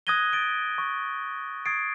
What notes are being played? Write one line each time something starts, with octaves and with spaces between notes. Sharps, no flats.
D#6 F#6 G#6 A#6 D#7 G7
A6 D7 G7
C#6
C#6 D#6 G#6 A6 C7 D7